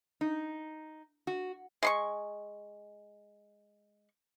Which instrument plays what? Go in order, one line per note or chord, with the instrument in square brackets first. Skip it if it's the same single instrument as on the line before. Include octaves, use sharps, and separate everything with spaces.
[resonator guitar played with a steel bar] D#4
F#4
[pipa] G#3 C6 C#6